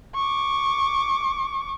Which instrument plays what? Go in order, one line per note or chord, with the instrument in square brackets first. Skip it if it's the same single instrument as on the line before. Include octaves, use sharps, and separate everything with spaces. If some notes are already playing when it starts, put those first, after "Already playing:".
[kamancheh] C#6 D6